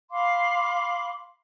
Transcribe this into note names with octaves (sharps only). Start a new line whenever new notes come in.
F5 B5 C6 D6